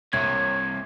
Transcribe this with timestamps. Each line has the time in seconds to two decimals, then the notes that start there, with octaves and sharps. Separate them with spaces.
0.13 C2 G2 C3 C#5 G#6